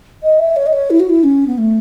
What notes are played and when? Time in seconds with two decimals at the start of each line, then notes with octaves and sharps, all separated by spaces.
0.23 D#5
0.39 E5
0.56 C#5
0.66 D#5
0.73 C#5
0.90 E4
1.00 F#4
1.09 E4
1.24 C#4
1.47 B3
1.58 A3